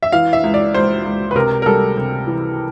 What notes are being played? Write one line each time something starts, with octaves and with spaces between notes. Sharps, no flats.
E5
E3 F5
E5
C#2
D5
C#2 C5
C#2
B4
C3 A#4
A#4
G3 A4
C3
E3